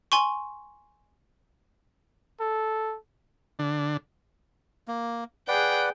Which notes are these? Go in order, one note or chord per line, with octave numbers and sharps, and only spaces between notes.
G#5 C6 C#6
A4
D3
A#3
G#4 B4 D5 F#5 G5